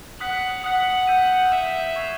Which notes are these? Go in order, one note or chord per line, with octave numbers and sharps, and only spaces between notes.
F#5 D#6 F#6 B6
F#5 D#6 F#6 B6
E6 G6 B6 D#7
E5 E6 G6 B6 D#7
C#6 E6 G#6 C7 F7